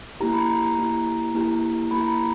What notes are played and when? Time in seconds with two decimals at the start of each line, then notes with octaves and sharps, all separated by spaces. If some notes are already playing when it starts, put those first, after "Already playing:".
0.20 A#3 E4 G4 A#5
0.33 B5
0.46 A#5
0.78 A#3 E4 G4
1.34 A#3 E4 G4
1.91 A#3 E4 G4 B5
2.00 A#5
2.08 B5